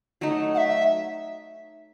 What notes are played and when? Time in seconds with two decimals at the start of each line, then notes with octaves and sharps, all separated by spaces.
0.21 F#3 A3 D#4
0.54 F#5
0.58 E5